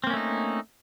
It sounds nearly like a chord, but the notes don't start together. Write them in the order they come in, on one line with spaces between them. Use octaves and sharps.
C4 A#3 C#4 A3 D#4